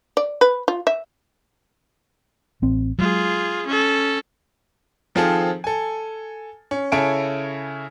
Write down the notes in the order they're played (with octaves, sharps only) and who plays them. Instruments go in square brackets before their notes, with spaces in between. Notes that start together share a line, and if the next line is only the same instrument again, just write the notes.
[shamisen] D5
B4
F4
E5
[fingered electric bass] A1 C4
[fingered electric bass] F#3 G#3 [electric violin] F4 G#4
[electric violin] C#4 A4
[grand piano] D#3 F3 C4 F4 G#4 A4
A4 G#5
C#4
C#3 E4 A4 C#5 G#5 D7